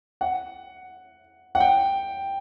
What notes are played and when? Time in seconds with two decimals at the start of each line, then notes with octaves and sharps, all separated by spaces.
0.21 F#5
1.55 F#5
1.60 G5